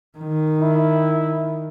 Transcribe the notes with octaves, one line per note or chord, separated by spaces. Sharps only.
D#3
E4